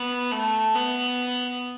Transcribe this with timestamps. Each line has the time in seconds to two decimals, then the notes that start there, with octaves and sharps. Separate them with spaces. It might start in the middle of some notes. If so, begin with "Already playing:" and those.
Already playing: B3
0.32 A3
0.75 B3